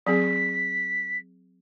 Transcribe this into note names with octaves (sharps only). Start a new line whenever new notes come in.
F#3 C4 G#4 B6